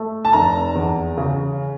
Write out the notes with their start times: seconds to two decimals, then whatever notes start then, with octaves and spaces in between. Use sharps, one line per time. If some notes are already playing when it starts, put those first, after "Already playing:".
Already playing: A3
0.25 A5
0.33 F1 A#5
0.75 E2
1.17 C#3